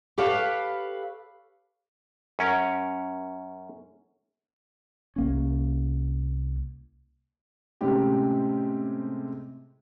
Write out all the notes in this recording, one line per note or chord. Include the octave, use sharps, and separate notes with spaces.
G4 A4 B4 C#5 F5 A5
F#2 C#4 A#4
C2 A#3 C#4
A2 C3 G#3 C#4 G4